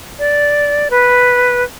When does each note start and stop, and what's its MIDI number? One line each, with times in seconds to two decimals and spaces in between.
0.19 0.88 74
0.90 1.64 71